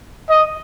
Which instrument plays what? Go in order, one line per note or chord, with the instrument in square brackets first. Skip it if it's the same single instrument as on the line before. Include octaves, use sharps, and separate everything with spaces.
[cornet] D#5